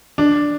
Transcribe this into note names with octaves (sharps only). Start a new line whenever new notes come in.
D4